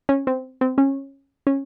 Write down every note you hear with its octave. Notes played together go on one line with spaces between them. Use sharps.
C#4
C4
C4
C#4
C#4